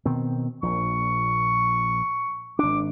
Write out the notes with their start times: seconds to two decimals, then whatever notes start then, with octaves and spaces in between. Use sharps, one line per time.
0.05 B2 D#3 C4
0.63 A#1 A#2 C#6
2.59 G#1 D4 D6